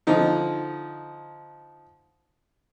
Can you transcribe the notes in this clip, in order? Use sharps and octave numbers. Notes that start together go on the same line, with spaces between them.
D3 F3 D#4